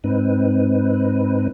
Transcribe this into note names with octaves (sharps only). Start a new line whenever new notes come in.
G#2 C4 D#4 B4